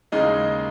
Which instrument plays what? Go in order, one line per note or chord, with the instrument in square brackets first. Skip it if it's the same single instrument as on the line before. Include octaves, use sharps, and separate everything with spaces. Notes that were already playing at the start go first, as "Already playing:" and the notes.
[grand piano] D#2 C#3 G#3 D#4 D#5